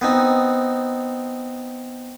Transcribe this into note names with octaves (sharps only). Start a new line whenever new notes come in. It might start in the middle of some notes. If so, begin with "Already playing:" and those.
B3 C4 D#4